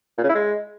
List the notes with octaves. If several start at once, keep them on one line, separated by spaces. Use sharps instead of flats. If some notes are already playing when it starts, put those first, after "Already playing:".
A#2
C#3
E4
G#3